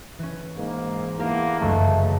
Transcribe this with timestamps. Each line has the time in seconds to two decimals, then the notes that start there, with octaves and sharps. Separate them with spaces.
0.19 E3 C#4
0.57 G#2 A#3
1.19 E2 A3 A#3 G4 A#4
1.60 G1 C#2 F#2 A3